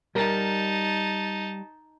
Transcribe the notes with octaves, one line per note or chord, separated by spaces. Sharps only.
G3 D#4 A#4 A5